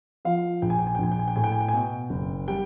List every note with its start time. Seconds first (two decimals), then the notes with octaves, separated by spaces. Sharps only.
0.25 F3 F5
0.62 A#1 G5
0.70 G#5
0.79 G5
0.87 G#5
0.95 G5
0.99 A#1 G#5
1.12 G5
1.19 G#5
1.28 G5
1.36 A2 G#5
1.44 G5
1.52 G#5
1.61 G5
1.68 G#5
1.73 B2 G5
2.10 F#1
2.48 G3 G5